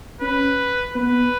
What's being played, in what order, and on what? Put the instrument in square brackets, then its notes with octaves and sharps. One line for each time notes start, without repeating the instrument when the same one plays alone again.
[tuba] C#4 [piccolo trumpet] B4
[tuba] B3 [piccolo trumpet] B4